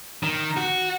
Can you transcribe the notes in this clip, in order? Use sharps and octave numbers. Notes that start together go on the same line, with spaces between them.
D#3
F#4